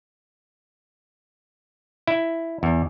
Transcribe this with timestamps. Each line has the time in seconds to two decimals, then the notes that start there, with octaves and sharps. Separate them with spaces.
2.07 E4
2.63 E2